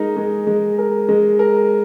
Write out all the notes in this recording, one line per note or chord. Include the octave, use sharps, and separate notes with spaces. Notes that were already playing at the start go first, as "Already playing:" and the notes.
Already playing: G#3 D#4 A#4
G#3
G#3
A#4
G#3
A#4